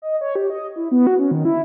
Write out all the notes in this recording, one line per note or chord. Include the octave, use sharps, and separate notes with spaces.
D#5
C#5
G4
D#5
E4
B3
F#4
C#4
D#3
E4